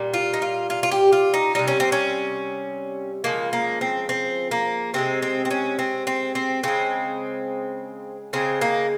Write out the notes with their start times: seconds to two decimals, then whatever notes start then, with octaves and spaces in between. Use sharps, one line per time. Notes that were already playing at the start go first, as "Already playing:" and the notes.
Already playing: A#2 G3
0.14 F4
0.34 D#4
0.42 F4
0.70 F4
0.83 F4
0.92 G4
1.12 F4
1.34 D#4
1.55 C3 G3 D#4
1.68 C#4
1.80 C4
1.92 C#4
3.24 C#3 F3 G#3 A#3
3.53 A#3
3.81 C4
4.09 C4
4.51 A#3
4.94 C3 D#3 G#3 C4
5.22 C4
5.45 C4
5.51 C#4
5.79 C4
6.07 C4
6.35 C4
6.63 C#3 G#3 C4
8.33 C#3 G#3 C4
8.61 A#3